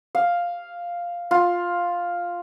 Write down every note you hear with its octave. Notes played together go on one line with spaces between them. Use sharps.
F5
F4